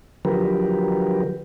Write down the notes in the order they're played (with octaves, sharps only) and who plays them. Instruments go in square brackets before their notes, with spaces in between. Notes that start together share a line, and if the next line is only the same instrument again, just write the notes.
[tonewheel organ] D3 F3 F#3 G4 A#4 B4